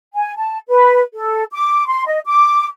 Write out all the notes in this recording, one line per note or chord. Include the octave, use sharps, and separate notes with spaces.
G#5
A5
B4
A4
D6
C6
D#5
D6